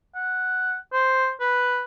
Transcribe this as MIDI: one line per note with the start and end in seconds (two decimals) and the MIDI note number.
0.15 0.75 78
0.92 1.31 72
1.40 1.83 71